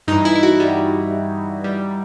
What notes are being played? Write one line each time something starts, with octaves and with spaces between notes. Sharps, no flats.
G2 E3 D#4
E4
E4
F#4
G3
G3